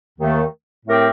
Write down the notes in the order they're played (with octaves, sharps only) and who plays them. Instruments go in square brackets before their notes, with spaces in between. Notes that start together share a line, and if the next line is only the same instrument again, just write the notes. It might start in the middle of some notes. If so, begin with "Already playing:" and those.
[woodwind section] D#2 D#3 A3
A2 A3 C4 G4 A#4